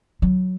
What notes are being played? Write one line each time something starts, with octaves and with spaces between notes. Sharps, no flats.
F#3